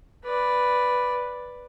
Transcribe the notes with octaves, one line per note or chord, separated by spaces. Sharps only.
B4 D5